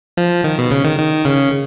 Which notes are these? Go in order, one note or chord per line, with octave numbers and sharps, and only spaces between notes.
F3
D#3
B2
C#3
D#3
D#3
C#3